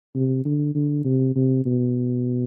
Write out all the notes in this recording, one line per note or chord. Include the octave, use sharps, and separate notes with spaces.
C3
D3
D3
C3
C3
B2